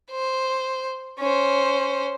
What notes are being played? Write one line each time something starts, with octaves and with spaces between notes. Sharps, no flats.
C5
C#4 C5